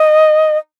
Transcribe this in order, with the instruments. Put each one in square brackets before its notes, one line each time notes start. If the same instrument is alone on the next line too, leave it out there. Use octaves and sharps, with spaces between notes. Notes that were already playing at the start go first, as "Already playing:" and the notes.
Already playing: [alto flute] D#5